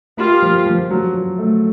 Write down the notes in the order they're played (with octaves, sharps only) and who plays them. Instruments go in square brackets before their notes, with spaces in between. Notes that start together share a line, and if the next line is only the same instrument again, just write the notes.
[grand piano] A#3 [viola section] F4 G4
[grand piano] F3
F3
F#3
F#3
A3